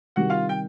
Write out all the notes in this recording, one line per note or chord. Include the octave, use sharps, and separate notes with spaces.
C3 D#3 G3 F#4 F#5
F4 F5
G5